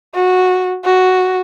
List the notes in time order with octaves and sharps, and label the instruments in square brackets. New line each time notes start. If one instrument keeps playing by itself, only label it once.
[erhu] F#4
F#4